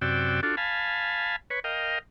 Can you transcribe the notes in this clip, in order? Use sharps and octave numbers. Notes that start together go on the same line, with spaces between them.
F#2 C3 F#4 D5 G5 E6
D4 F4 F#4 A4
F5 G#5 A5 B5
B4 C#5
A#4 D#5 F5 G5